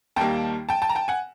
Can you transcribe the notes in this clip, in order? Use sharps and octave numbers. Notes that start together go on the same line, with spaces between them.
D#2 D#3 G3 A#3 G5 A5
G5 A5
G5 A5
A#5
G5 A5
F#5 G#5